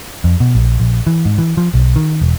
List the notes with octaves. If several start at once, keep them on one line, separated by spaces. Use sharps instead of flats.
F2
B2
A#1
A#1
E3
G#2
E3
F3
B1
D#3
E1